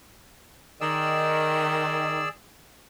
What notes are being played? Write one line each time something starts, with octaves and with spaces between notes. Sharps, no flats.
D#3 G#4 D5 E6